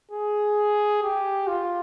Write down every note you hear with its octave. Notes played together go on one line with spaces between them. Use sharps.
G#4
G4
F4